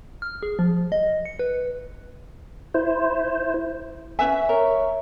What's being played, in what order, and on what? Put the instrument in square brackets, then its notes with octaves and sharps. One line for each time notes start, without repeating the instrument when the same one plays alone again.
[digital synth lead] F6
G#4
F3
D#5
C#7
B4
[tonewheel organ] E4 C5
[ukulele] C#4 B4 G#5 [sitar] E5
[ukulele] A#4 [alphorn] C#5